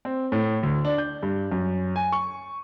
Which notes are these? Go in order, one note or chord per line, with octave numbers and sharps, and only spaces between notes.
C4
A2
D2
D4
G6
G2
F#2
G#5
C#6